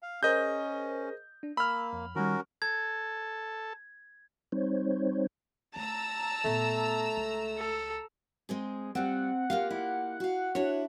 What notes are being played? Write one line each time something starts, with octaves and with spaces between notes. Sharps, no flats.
F5
C#4 G#4 A#4 C5 D#5 G6
D4
A#3 B5 E6 F6
F2
D#3 G3 C#4 F#4 A#4
A4 G#6
G3 C4 D#4 C5 C#5
A3 A5 A#5 E6
A#2 A3 B3
C#2
A4
G#3 C4 G#4
G3 C4 F4 F#5
A#3 F4 G4 F5
E4
F#4 F5
D4 E4 F#4 C#5